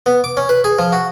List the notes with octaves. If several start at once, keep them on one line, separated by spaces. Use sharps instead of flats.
B3
D6
C#4
B4
G#4
F3
F#4